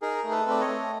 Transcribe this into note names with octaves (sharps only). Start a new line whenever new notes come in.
D#4 G#4 A#4
A3
A4 B4
C4 D5
C#5 D#5
A3